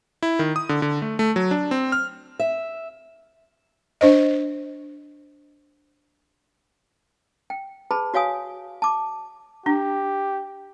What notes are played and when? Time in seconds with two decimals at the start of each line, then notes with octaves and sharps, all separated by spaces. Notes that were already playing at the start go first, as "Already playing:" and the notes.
0.23 E4
0.39 D#3
0.56 D#6
0.69 D3
0.82 D3
1.02 A3
1.19 A3
1.36 F#3
1.51 D4
1.71 C4
1.92 F6
2.39 E5
4.01 D4 C5 D#5
7.50 G5
7.91 G#4 B4 A5 B5
8.14 F#4 C#5 F5 G#5 D#6
8.82 A5 D6
9.66 D4 G4